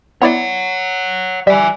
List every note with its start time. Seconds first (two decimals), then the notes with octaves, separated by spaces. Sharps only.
0.22 B3 E4 C#5 D5 F#5
1.47 G3 E5 G#5